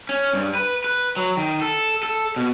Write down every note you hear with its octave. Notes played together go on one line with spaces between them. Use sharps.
C#4
G2
B4
B4
F#3
D#3
A4
A4
B2